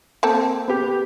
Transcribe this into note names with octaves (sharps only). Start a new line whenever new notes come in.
A#3 C4 A4
B3 G4